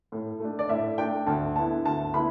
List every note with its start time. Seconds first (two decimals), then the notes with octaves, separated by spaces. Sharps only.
0.12 A2
0.40 A3 D4
0.59 D5
0.69 A2 E5
0.98 A3 D4 G5
1.27 D2 A5
1.56 D3 B3 E4 A5
1.85 D2 A5
2.14 D3 B3 E4 B5